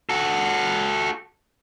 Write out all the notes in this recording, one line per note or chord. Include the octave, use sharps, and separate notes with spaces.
F#4 A4